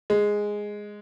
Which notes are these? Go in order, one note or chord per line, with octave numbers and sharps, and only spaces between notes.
G#3